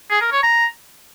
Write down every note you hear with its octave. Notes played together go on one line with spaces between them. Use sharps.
G#4
A#4
C#5
A#5